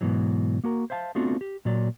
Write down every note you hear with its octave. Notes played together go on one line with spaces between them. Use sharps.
G#2 B2 E3 F#3
A#3 F#4 A#4
C5 E5 F5 G#5 A5
A3 B3 C4 D4 F4 F#4
G4
A#2 F#3 D5